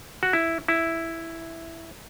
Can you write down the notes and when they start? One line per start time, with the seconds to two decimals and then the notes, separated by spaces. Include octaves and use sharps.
0.23 F#4
0.33 E4
0.68 E4